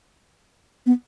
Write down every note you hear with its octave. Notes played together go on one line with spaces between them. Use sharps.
B3